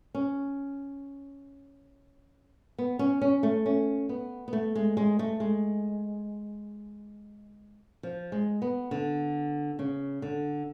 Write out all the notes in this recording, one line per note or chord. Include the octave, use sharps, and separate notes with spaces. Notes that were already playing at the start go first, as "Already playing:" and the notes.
C#4
B3
C#4
C#4
A3
C#4
B3
B3
A3
G#3
G#3
A3
G#3
F3
G#3
B3
D3
C#3
D3